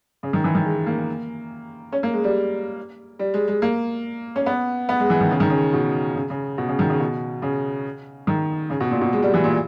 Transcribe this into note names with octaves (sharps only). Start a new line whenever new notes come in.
C#3
D#3
E3
D#3
G#3
A#3
C#4
A#3
G#3
G3
G3
G#3
G#3
A#3
C#4
B3
B3
G#3
E3
D#3
C#3
D#3
C#3
B2
C#3
C#3
B2
C#3
D#3
C#3
B2
C#3
D#3
C#3
B2
A#2
B2
G#3
G3
E3
A#2